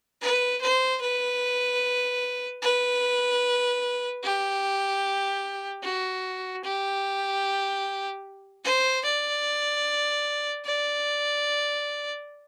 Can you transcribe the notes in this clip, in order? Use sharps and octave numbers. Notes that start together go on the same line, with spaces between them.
B4
C5
B4
B4
G4
F#4
G4
C5
D5
D5